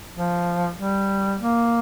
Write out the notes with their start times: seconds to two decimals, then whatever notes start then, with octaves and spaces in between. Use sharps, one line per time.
0.16 F3
0.79 G3
1.40 A#3